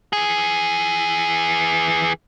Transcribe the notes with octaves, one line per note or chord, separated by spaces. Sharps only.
E3 G#4